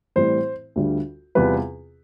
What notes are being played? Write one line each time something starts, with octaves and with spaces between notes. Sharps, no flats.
A2 E3 G3 C4 E4 C5
D2 D3 G3 D4 F4
E2 C3 G3 C4 F4 B4